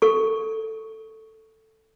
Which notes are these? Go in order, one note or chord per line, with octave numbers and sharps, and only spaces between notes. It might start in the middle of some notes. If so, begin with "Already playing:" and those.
A4 C#6